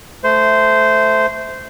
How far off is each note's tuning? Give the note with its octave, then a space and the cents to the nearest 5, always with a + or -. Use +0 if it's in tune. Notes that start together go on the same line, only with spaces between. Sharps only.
A3 -5 C5 -15